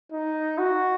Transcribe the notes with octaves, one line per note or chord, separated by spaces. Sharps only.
D#4
F#4